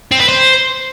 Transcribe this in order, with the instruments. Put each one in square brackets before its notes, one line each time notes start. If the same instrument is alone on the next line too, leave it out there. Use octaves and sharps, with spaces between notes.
[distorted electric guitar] C4
B4
C5